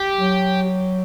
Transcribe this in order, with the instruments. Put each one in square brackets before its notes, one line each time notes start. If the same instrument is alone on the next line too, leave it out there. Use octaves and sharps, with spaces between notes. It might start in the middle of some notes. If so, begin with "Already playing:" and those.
Already playing: [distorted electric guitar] G4
[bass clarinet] F#3